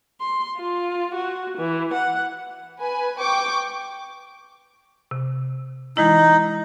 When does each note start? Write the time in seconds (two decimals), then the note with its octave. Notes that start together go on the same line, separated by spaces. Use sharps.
0.21 C6
0.57 F4
1.14 F#4
1.58 E3
1.93 F#5
2.79 B4 G#5
3.20 G5 C#6 D6
5.11 C3
5.97 E3 G#3 D#4 E4